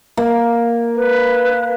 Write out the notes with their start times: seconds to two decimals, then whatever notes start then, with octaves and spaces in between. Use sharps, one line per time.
0.17 A#3
0.96 B4